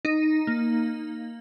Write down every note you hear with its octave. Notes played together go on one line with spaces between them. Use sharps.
D#4
A#3